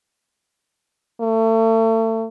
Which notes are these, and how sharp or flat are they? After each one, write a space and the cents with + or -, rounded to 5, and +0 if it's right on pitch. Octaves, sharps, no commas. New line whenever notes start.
A3 +35